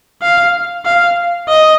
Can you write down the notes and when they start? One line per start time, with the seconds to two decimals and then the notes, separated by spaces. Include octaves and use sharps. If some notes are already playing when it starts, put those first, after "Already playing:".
0.22 F5
0.85 F5
1.48 D#5